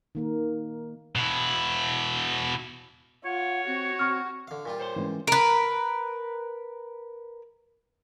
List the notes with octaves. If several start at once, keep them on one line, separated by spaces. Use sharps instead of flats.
D#3 A#3 A#4
B2 E4
F4 C#5 F#5
C4 F#4
C4 C#6 F6
D3 F5
A#2 G3 F4
C5 C#5 C6
E3 G#3 C#4
A#4 B4